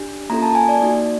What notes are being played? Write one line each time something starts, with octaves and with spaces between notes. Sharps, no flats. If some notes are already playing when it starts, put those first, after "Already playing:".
Already playing: D4 G4
A#3 C#4 F4 A4 A#5
A5
G#5
D5
A#3 D#4 F#4